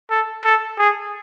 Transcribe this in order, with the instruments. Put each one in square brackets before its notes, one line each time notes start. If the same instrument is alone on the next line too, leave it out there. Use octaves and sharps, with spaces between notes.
[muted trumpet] A4
A4
G#4